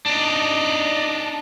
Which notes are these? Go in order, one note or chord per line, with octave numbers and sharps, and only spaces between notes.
D4 D#4